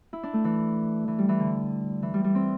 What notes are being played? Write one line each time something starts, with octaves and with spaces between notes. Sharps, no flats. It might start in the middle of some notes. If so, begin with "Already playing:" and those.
E4
D4
A3
E3
E3
G3
E3
D3
E3
G3
G3
C4